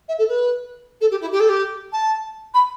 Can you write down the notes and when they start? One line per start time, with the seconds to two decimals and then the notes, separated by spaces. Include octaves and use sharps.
0.08 E5
0.19 A4
0.29 B4
1.01 A4
1.11 G4
1.21 E4
1.32 G4
1.40 A4
1.49 G4
1.93 A5
2.54 B5